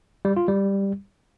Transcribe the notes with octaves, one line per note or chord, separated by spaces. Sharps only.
G3
F4
G3